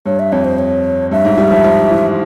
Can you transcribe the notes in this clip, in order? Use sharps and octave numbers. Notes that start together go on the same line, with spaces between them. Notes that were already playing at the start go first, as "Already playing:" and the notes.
G2 C#5
E5
F2 C#5
C5
C#5
G2 E5
G#2
G3
F3
F3
E3